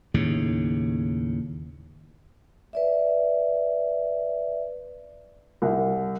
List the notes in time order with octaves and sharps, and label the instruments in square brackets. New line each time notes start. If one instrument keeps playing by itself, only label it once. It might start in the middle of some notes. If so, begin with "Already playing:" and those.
[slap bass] D#2 A2 C#3
[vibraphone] B4 D5 E5
[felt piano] C2